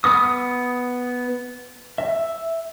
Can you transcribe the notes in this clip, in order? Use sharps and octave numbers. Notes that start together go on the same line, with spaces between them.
B3 D#6
E5